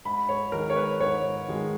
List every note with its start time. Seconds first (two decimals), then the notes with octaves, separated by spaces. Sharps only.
0.05 G#2 B5
0.29 C#5
0.52 D#3 G#3 A#4
0.70 C#5
0.76 B4
1.00 G#2 C#5
1.48 D#3 G#3